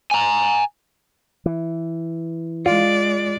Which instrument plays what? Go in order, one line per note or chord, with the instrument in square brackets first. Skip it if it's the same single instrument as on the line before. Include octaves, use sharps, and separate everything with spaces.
[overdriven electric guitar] G#5 A#5
[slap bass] E3
[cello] G#3 D5 [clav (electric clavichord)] F4